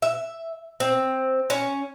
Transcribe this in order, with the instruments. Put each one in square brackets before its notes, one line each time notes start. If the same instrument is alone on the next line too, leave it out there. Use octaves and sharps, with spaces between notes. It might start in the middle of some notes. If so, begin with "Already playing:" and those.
[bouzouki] E5
C4
C#4